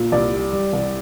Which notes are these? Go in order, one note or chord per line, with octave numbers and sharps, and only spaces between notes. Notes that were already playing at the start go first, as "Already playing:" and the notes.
Already playing: A#2
C2 D5
G3
G3
C2